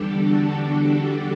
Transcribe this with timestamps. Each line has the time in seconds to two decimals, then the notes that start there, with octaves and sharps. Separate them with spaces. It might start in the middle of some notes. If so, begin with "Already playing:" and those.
Already playing: E2 D3 G3 D4 G4 A4
0.20 F#4